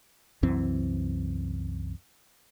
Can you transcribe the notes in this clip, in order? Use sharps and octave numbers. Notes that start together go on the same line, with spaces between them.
C2 F#2 E3 C4